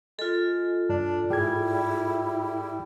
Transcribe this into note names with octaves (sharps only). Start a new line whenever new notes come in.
G#3 F4 A4
G2 D4
G#2 G3 E4 G#4 G#6
G3